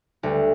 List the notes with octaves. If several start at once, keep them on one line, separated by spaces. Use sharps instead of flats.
D2 D3 G3